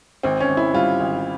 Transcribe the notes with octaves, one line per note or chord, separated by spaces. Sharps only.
G#1 C4
C#4
G#1
E4
G3 F4
G#1